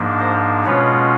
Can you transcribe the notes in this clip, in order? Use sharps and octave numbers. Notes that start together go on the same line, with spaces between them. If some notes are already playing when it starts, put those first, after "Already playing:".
Already playing: G#2 F3 A#3 D4
A#4 C5
B2 G#3 C#4 F4 B4 C#5